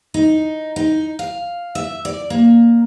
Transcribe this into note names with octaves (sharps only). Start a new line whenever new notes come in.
D#4
D#4
F5
E5
D5
A#3